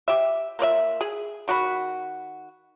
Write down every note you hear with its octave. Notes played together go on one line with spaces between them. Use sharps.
G4 E5
A#3 F4 D5 E5
G#4
D#3 F#4 G4 B5